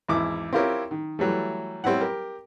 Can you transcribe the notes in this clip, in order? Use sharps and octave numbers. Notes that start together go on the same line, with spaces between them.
G#1 E2 E4 D6
C4 E4 F4 G4 A#4 C#5
D#3
E3 F#3 G3 A3
G3 C4 C#4 E4 F#5
G4 A#4